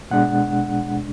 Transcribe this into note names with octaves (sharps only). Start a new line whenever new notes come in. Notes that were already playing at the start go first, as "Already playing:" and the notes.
B2 G#3 D4 F#5